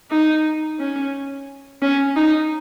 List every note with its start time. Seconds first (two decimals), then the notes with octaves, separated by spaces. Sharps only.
0.11 D#4
0.79 C#4
1.82 C#4
2.16 D#4